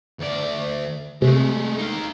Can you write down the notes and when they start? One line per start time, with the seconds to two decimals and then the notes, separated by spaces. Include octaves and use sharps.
0.19 D2 D5
1.22 C3 G#3 A3
1.78 D#4 F5